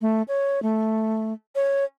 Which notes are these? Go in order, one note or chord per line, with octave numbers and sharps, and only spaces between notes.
A3
C#5
A3
C#5